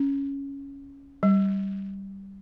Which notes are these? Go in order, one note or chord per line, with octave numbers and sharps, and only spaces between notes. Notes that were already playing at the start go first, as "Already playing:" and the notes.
Already playing: C#4
G3